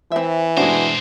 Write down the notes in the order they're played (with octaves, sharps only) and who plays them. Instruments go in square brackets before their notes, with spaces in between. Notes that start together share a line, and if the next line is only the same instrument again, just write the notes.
[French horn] E3 [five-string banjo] C4 E5
[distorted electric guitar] B2 C5 [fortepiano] G#3 D4 [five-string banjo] F#4